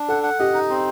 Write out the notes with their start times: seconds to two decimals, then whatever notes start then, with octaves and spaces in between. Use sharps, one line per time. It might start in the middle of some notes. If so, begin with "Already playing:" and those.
Already playing: D4
0.08 A4 F#5
0.23 F#5
0.39 G4 D#5
0.54 D#4
0.70 C4